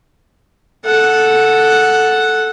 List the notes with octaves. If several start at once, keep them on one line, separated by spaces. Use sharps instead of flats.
A4 F#5